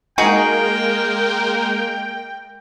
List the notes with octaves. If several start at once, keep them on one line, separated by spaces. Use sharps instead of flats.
G#3 A#3 D#4 F#4 G#4 A#4 G5